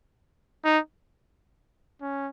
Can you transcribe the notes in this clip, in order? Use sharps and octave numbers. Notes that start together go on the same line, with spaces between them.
D#4
C#4